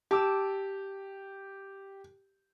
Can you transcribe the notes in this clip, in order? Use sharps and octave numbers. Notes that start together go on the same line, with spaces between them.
G4 A5 D6 E6